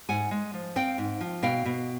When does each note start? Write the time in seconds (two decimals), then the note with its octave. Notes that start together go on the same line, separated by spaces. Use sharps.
0.09 G#2 F#5 G#5
0.31 G#3
0.54 F3
0.76 C4 F5 G5
0.98 G#2
1.21 F3
1.43 B2 F5 G5
1.65 B2